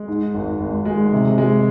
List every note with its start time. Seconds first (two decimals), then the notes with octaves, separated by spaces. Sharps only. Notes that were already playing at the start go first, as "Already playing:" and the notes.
Already playing: G#3
0.08 G#2
0.34 G#1
0.60 G#1
0.85 G#3
1.13 C3
1.38 G#3